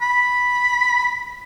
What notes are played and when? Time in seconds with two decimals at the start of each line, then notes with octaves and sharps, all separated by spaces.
0.02 B5